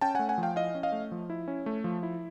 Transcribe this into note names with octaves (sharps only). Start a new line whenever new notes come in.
C#4 G5 A5
A3 F#5 G#5
F#5 G#5
F3
F5 G5
E4 D#5 F5
C#4
D#5 F5
A3
F3
E4
C#4
A3
F3
E4